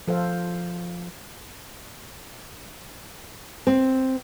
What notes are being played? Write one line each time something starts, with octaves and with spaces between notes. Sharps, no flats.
F3 A4 C5 F5
C4